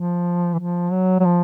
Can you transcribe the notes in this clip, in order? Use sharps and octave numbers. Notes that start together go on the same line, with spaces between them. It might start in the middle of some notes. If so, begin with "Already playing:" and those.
Already playing: F3
E3
F3
F#3
F#3
F3